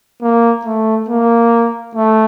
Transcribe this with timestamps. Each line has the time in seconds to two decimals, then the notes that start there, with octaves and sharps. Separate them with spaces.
0.22 A#3
0.65 A3
1.09 A#3
1.95 A3